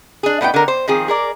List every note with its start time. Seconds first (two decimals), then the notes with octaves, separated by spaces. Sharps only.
0.23 D4 G#4
0.41 A2 B3 D#4 G5
0.54 D3 A#4
0.68 C5
0.88 D#3 F3 C4 G#4
1.08 G#4 A#4 D5